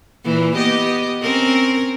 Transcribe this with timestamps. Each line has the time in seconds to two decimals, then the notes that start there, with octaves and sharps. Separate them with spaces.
0.24 A#2 E3 A#3
0.55 B3 G4 D#5
1.21 C4 C#4 A#4